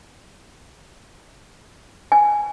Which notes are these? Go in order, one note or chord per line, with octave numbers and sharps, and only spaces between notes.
G#5